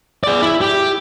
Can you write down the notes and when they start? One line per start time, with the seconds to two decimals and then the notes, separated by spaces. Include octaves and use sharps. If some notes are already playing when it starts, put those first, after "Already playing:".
0.24 G#4 D5
0.42 E4
0.61 G4